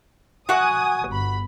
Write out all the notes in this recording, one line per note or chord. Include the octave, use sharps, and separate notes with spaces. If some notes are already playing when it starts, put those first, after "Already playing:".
F#4 F#5 G#5 D#6
G1 B5